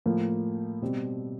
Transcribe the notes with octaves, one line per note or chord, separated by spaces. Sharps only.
A2 F3 A#3
B2 G3 C4